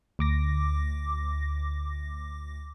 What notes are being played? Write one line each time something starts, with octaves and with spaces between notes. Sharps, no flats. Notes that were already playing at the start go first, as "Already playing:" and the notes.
D2 D6 A#6